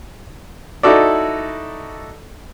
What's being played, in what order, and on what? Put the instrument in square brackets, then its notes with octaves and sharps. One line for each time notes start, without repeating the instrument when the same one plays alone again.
[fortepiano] D#4 E4 F#4 A4 D5